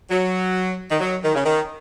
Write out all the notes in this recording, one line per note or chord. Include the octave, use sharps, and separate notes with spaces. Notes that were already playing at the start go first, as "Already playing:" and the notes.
F#3
D#3
F#3
D#3
C#3
D#3